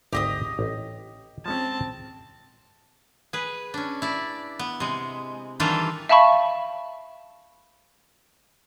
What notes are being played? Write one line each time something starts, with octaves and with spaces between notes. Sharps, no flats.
G#1 D2 C4 G4 D#5 D#6
A1
F3 G#3 C4 C#4 A5
G#4 B4
C#4 D4
E4 D5
B3
C3 G#3
D#3 E3 G3 D4 F4 A4
E5 F5 A5 B5 C#6